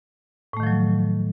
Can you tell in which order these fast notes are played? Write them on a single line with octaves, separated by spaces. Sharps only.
A2 A3 D#3 F3 F#3